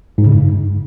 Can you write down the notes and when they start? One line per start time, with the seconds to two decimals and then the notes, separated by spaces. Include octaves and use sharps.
0.18 G#2
0.26 C#3
0.34 G2